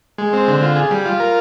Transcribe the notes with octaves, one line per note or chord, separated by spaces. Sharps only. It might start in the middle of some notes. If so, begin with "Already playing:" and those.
G#3
C4
D3
F4
G#4
G3
F4
A#4